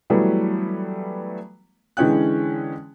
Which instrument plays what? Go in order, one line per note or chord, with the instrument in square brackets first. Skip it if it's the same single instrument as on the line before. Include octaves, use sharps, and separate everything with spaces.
[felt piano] E3 F#3 G3 A3 B3
D3 E3 G#3 C#4 G5 F#6